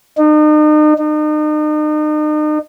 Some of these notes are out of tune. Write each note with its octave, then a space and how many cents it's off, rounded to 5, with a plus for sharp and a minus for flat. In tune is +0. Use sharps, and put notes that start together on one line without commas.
D#4 -40
D#4 -40